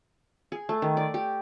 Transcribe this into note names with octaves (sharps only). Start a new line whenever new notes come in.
G#4
A3
D#3
D5
G4